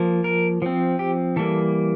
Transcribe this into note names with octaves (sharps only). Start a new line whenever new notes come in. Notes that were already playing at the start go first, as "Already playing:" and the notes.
Already playing: F3 A#3
A#4
F3 C4
G4
E3 G3 A#3 A4